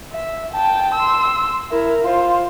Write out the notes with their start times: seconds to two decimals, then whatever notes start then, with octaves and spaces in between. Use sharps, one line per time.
0.12 E5
0.54 G5 A5
0.95 C6 E6
1.72 E4 A#4
2.04 F4 C5